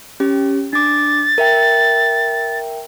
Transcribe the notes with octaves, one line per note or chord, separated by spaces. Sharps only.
C#4 G4
D4 D6 A6
A#4 E5 G5